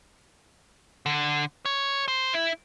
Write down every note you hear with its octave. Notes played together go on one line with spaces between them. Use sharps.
D3
C#5
C5
E4